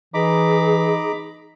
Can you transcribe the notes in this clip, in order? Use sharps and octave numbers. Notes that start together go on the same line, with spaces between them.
E3 D#4 G#4 A#5 B5 D6